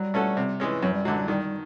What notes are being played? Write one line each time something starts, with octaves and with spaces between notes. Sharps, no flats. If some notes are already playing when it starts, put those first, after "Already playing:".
Already playing: F#3 G3
A3 C#4 F#4 A4
C3
E3 G#3 C#4
F#2 F#3
G3
D3 F#3 G#3
G3
D#3 G3
G3